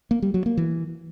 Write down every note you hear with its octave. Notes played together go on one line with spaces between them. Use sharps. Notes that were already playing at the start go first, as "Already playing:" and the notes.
A#3
G3
F#3
A#3
E3